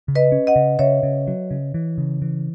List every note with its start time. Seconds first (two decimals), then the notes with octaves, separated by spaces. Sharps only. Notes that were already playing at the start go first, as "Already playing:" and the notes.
0.08 C#3
0.15 B4 D#5
0.32 C#4
0.47 D#5 F#5
0.56 C#3
0.79 C#3 C#5 E5
1.03 C#3
1.27 F#3
1.51 C#3
1.74 E3
1.98 C#3
2.22 E3